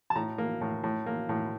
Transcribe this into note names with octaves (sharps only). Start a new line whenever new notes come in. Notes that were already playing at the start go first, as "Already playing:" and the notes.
A5
A2 A#5
A#3
A2
A2
A#3
A2